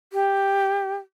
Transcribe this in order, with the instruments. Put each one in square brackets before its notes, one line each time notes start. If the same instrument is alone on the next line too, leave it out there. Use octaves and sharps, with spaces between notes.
[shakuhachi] G4